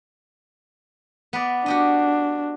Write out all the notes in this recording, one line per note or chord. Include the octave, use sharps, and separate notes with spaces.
B3 B4 D5
D4 F#4 G4 D#5